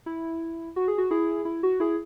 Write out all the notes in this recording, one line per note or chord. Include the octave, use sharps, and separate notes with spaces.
E4
F#4
G#4
F#4
E4 G#4
E4
F#4
E4 G#4